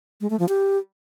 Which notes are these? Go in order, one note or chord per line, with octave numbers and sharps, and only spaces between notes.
G#3
A3
F3
G4